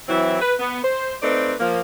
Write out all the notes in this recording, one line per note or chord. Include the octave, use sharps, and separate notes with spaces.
E3 F#3 C4 E4
B4
B3
C5
A3 C4 D#4 B4 D5
F3 A#3